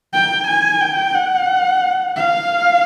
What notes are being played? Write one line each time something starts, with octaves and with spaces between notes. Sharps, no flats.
G5
G#5
G5
F#5
F5